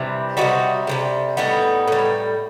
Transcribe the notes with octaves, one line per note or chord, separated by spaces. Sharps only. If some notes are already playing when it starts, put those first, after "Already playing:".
Already playing: C3 E3 G3
C3 E3 G3 D#4 F#4
C3 E3 G3
A2 G3 B3 D#4
A2 G3